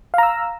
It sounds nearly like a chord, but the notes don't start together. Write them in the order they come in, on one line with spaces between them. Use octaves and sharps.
F5 A#5 E6